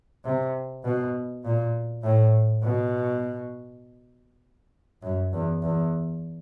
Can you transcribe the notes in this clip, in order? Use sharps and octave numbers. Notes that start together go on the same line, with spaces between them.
C3
B2
A#2
A2
B2
F#2
E2
E2